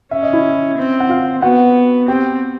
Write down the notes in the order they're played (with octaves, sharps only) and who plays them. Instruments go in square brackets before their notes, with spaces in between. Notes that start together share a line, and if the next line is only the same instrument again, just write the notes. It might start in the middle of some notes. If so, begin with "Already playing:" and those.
[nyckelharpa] C#4 [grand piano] E5
[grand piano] D#5
E4 E5
[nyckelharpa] C4
[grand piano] F#5
F4 F5
[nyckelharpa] B3 [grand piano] F#4 F#5
[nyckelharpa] C4 [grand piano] G4 G5